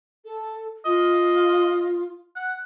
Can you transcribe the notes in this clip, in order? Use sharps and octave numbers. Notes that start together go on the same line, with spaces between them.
A4
F4 D#5
F#5